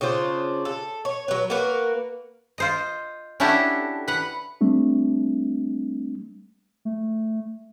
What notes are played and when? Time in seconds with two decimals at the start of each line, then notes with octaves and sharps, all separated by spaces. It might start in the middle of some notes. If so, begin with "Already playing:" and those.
0.01 C#3 D4 F4 C5
0.65 A4
1.05 C#5
1.28 F#3 B4
1.50 A#3 F#4 A#4 B4
2.58 F4 C5 D#5
3.40 C#4 D4 E4 F#4 G4 A4
4.08 B4 F#5
4.61 G3 A3 C4 D4
6.85 A3